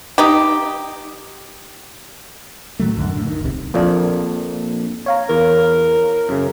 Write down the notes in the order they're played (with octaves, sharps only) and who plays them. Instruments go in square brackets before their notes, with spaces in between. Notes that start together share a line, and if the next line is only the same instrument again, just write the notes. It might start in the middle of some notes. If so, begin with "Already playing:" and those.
[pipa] D#4 G4
[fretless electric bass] A2 D#3 F#3 A3
C2 F#2 D3
A2 D3
D#3
D1 B1 C3
[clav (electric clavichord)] A#1 F2 A#2 [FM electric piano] A#3 D4
[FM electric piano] C#5 F5 A#5
[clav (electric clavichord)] E2 [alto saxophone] A#4
[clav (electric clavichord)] F#2 C#3